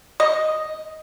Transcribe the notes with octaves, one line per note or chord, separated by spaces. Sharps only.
D#5